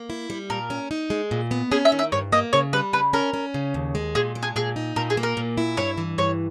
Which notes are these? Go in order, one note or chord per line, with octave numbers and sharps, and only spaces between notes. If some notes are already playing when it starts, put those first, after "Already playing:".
Already playing: A#3
E4
G3
A#2 A#4
C#4
D#4
G#3
A#2
B3
C#4 G#4
E5
D#3
E5
G2 C#5
A#3 D#5
C#3 C#5
G3 B4
C#3 B4
C#4 A#4
C#4
C#3
D#2
G#3
A#2 G#4
G#3
G#4
A#2 G#4
D#4
A#2 A#4
G#4
A#3
A#4
A#2
E4
G2 C#5
E3
G2 C#5